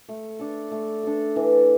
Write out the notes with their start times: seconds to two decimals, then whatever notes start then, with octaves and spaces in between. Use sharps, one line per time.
0.09 A3
0.39 D4 A4
0.72 A3
1.03 D4 A4
1.36 E3